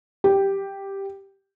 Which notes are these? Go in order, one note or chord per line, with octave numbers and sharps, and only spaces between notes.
G4